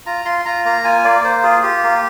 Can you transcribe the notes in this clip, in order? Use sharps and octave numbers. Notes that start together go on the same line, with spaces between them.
F4 A#5
F4 C6
F4 A#5
A#3 A#5
F4 G#5
A#3 D5
A#3 C5
F4 G#4
F4 G4
A#3